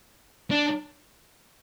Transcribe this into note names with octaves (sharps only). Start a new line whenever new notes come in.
D4